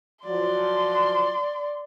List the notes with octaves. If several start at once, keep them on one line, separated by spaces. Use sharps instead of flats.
F3 F#3 D5 C6